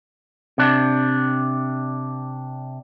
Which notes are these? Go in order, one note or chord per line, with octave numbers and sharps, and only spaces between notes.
C3 D4